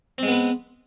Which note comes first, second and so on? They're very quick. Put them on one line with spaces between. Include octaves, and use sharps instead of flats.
C4 G#3 B3 B4